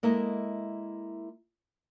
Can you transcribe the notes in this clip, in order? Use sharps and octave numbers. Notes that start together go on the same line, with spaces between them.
G#3 A#3 E4 A4 D#5 E5